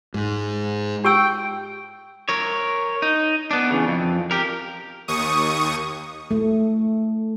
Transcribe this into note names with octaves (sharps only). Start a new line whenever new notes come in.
G#2
G4 G5 E6
A#4 C#5
D#4
B3 D4
E2 C#3
F2
G4 A#4
D#2 C#6 D#6
A3